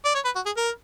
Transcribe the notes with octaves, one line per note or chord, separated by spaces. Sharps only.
D5
C#5
B4
F#4
G#4
A#4